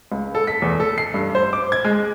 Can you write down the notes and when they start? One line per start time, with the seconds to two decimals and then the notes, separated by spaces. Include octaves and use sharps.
0.12 C#2
0.35 A4
0.47 B6
0.62 E2
0.80 A4
0.98 C7
1.14 G2
1.35 C5
1.53 D6
1.72 G#6
1.85 G#3